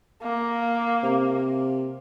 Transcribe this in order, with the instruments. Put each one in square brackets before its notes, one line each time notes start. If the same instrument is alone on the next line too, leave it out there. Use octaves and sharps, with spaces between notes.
[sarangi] A#3
[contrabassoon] C3